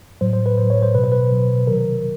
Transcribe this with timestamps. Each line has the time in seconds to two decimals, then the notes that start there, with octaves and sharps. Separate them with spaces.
0.21 A2 F#3 C5
0.33 C5
0.46 B4
0.58 A2 F#3 C5
0.70 C#5
0.82 C5
0.95 B2 F#3 B4
1.04 C5
1.12 B4
1.31 B2 F#3
1.67 C3 D#3 F#3 A#4